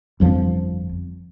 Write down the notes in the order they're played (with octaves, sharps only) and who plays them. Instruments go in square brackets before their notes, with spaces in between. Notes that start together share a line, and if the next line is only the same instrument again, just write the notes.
[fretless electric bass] G1 F2 F3